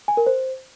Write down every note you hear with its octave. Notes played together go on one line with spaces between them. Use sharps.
G#5
A#4
C5